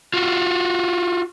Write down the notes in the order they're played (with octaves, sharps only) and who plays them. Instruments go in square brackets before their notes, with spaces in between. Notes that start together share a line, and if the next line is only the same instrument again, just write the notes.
[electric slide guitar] F4 F#4